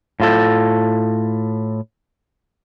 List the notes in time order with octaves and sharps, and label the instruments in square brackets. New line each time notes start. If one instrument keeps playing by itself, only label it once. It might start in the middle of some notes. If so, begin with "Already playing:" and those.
[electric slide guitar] A2 F4 A4